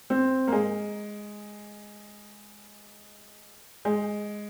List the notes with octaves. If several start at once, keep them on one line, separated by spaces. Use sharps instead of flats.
C4
A#3
G#3
G#3